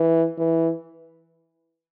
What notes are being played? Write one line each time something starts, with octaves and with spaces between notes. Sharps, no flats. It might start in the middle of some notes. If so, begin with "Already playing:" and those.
Already playing: E3
E3